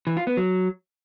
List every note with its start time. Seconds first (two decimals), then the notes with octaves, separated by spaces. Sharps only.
0.07 E3
0.17 F4
0.27 B3
0.37 F#3